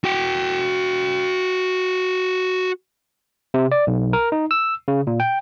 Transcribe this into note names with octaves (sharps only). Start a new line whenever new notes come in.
F#4 G5
C3
D5
B1
A#4
D#4
E6
C#3
A#2
G5